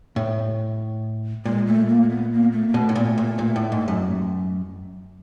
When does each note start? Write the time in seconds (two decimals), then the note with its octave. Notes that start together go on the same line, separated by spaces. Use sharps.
0.16 A2
1.45 A#2 G#3
1.67 A3
1.89 A#3
2.10 B3
2.32 A#3
2.52 A3
2.68 A#3
2.74 B2 A3
2.89 A2
2.96 A#2
3.18 A#2
3.39 A#2
3.56 A2
3.72 G#2
3.88 F#2